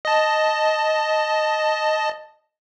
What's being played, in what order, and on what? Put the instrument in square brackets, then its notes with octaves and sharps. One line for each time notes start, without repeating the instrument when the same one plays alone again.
[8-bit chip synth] D#5 A5